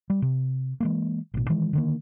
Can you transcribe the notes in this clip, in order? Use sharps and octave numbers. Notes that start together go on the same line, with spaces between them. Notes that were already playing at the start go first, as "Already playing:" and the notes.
G3
C3
E3 G#3 A#3
A1 B2
D#3 E3 G#3
D3 D#3 A#3